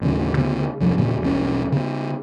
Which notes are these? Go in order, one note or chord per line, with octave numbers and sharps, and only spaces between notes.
A1 D#2 C#3
D2 C#3 B3
C2 F2 F#3
E2 A#2 C#3 C#4
E1 B1 A#2 C#4
C#3 B3